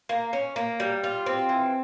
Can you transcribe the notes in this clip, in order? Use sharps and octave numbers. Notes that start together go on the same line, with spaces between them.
A#3
C#4
A#3
G3
F4
C4
E3